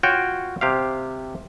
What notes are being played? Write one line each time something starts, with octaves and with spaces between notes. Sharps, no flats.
F4 F#4 C#5 G5
C3 G4 F5